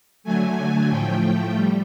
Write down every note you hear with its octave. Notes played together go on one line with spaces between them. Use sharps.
D3 F#3 A3 G#5
A2 F3 A3 G5
G3